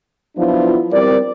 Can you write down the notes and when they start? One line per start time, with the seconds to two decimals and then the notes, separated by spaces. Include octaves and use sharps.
0.37 F3 F#3 B3 D4 E4 F4
0.91 G3 C4 A#4 D5